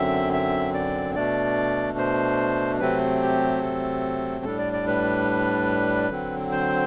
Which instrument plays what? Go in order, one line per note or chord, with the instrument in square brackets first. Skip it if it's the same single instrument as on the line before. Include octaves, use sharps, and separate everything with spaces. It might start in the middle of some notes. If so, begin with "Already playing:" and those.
Already playing: [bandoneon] F#2 D3 F#3 C4 E5
E5
D5
B2 A3 D4 D5
C5
C3 F#3 A3 C4 B4
G4
A4
A2 G3 D4 A4
D5
D5
B4
D3 F#3 C4
C5